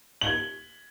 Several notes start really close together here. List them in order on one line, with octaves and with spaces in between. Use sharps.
F#7 G7 G#6